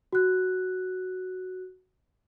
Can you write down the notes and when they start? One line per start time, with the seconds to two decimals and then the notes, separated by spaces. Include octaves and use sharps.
0.13 F#4 F#6